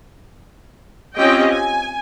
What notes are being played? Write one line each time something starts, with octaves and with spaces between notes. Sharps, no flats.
C4 C#4 F4 G4 D#5 G5
G#5